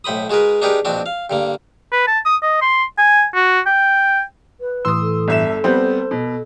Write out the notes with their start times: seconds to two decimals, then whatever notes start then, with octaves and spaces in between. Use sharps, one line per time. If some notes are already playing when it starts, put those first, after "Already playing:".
0.04 B1 A2 C5 B5 D#6
0.30 G#3 F#4 G#4 A#4 B4
0.62 D4 D#4 G4 G#4 A#4 B4
0.85 A#1 B2 C4 D4 F#4
1.06 F5
1.30 G2 D3 A#3
1.92 B4
2.07 A5
2.25 D#6
2.43 D#5
2.62 C6
2.98 G#5
3.34 F#4
3.66 G5
4.60 B4
4.85 A2 E3 C6 D#6 E6
5.02 A4
5.28 G1 E5 E7
5.64 G3 B3 C4 C5 G6
6.11 B2